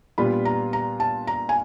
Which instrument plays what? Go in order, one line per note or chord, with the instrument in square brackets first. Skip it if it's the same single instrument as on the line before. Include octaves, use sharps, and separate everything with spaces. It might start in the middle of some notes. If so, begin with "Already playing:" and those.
[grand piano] A#2 G3 B3 D4 F4 [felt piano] B5
[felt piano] A#5
A#5
A5
A#5
G#5